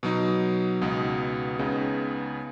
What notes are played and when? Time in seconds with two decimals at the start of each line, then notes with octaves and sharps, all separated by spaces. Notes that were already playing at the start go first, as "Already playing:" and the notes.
0.03 B2 F#3 D#4
0.81 C#2 B2 B3 D#4
1.59 C#2 C#3 B3 D#4